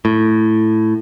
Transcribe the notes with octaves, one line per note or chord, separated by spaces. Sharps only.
A2